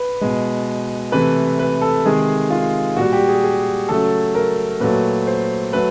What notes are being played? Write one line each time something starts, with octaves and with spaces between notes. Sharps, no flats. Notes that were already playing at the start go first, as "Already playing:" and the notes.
Already playing: B4
B2 G#3
C3 E3 A3 B4
B4
A4
C3 D#3 G#3 G#4
F4
A#2 G3 F#4
G4
G#4
G#4
C#3 F#3 A3 A4
A#4
A#2 F#3 A3 B4
C5
F#3 A3 B4